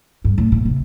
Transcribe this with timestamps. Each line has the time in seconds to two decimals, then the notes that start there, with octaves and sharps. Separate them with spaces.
0.24 G2
0.38 A2
0.52 A#2
0.65 C3